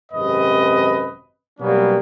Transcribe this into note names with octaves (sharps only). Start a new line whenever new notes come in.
G#1 F#2 C3 B4 D#5
B2 F#3 G3 A#3 B3 C#4